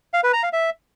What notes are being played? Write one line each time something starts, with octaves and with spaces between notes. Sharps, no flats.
F5
B4
A#5
F5
E5